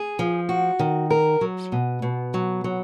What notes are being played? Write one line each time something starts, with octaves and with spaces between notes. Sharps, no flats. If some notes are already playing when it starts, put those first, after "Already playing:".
Already playing: G#4
F3
F#4
D#3
A#4
F#3
B2
B2
F#3
F#3